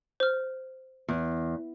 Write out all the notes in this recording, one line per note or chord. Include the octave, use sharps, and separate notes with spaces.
C5 F6
E2